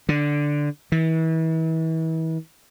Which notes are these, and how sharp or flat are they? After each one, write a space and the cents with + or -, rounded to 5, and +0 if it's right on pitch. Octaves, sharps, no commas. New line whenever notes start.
D3 +0
E3 -35